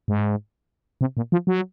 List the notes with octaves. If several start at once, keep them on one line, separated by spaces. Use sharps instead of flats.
G#2
C3
A#2
F3
F#3